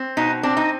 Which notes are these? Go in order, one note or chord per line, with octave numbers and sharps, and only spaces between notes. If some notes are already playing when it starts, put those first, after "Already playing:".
Already playing: C4
B2 D#4
C4 D4
D#4